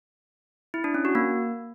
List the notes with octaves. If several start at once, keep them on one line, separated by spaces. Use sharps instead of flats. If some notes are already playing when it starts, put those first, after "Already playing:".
E4
D4
C#4
F#4
A#3